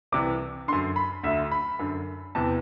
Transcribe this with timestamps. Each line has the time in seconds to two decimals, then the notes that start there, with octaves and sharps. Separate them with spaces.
0.12 C2 C3 E3 D6
0.68 D3 C6
0.72 F#2
0.96 B5
1.23 D2 D3 E5
1.52 B5
1.79 F#2 D3
2.35 E2 C3 E3 A5